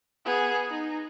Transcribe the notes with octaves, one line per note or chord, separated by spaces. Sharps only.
B3 G#4
D#4